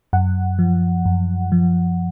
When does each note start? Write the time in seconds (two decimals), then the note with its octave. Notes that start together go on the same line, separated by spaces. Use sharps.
0.13 F#2 F#5
0.59 F3
1.06 F#2
1.52 F3